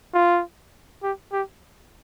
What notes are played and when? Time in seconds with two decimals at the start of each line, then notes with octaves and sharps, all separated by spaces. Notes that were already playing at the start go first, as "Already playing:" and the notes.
0.15 F4
1.03 G4
1.33 G4